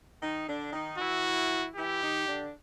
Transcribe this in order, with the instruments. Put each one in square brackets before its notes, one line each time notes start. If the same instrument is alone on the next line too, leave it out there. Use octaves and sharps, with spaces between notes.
[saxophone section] D#3 D#4
D3 D4
D#3 D#4
[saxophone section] E3 E4 [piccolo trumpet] F#4
[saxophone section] E3 E4 [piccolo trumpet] G4
[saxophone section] D#3 D#4
D3 D4